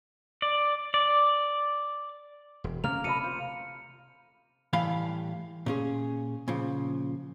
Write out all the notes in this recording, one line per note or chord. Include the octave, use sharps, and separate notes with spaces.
D5
D5
E1
C3 A3 A#3 C#4 A#4 F6 F7
C3 A4 D#5 B5 C#7 D#7
F4 C5
A2 E3 G3 F5 B5
A#2 C#4 G#4
A#2 C#3 F3